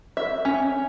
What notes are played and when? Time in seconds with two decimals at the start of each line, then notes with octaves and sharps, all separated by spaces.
0.17 E5
0.45 C#4